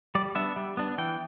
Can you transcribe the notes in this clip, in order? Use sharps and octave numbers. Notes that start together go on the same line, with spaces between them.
G3 D5
B3 D4 E5
G3
B3 D4
E3 G5